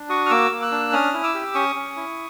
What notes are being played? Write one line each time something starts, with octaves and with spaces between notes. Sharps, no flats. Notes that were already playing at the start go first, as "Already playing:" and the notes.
Already playing: D4
F#4 C#6 D#6
F6
A#3 D6 E6
A#3
E6 F#6
D4
C#4 D#6 F6
E4
D6 E6
G4
C#4 C#6 D#6
C#4
E4